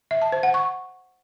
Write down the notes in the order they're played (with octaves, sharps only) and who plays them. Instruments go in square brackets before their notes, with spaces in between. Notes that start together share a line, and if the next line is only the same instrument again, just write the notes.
[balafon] E5
A5
C5
F#5
C#6